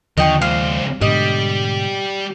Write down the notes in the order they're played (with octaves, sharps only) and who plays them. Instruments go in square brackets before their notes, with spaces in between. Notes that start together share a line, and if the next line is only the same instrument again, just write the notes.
[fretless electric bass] D#2 F3 [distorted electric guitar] D3 [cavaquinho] D#5 G5 C#6
[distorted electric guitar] C#2 C5 [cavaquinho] F5
[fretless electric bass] G#2 B2 D3 [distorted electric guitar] G3 [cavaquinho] D#5